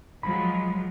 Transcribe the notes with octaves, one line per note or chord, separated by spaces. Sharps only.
F3 F#3 G#3 B5